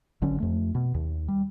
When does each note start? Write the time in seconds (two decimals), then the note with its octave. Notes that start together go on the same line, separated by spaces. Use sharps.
0.22 G#1 D3 F#3 C#4
0.40 F2 A3
0.75 B2
0.95 D#2
1.28 G3